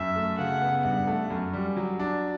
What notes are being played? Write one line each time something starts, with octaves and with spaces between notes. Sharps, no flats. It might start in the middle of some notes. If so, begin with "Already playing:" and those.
Already playing: F#2 E5
A3
C#3 F#5
B3
G2 F#5
A3
F#2
G3
F#3
D4